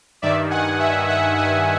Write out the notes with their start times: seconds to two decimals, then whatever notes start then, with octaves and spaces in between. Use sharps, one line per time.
0.22 G2 D#3 D5 E5
0.50 F#5 G#5
0.80 E5 F#5
1.09 E5 F#5
1.37 F#5 G#5